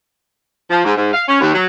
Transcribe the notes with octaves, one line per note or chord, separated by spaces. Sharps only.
F3
G#2
G#2
F5
C#4
D#2
F#3